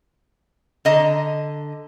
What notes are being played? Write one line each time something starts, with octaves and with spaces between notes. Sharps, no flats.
D3 D#5 A#5